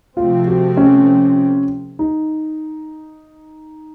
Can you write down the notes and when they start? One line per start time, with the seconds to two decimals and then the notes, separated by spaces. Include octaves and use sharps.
0.17 C3 F3 A3 C4 F4
0.47 F#4
0.77 C#4
1.99 D#4